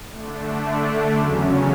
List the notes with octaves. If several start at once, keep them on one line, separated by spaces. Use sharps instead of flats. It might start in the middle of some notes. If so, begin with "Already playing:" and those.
D3 A3 D4
E2 C#3 F#3 C#4